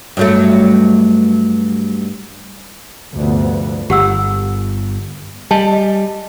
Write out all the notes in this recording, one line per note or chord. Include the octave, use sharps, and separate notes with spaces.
G2 F#3 A3
F1 D2 G2 F3 B3
G1 G4 F#5 E6
G3 D#5 G#5 A5
D#5